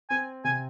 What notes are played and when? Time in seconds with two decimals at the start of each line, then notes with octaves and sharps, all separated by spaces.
0.10 C4 G#5
0.44 C3 G#5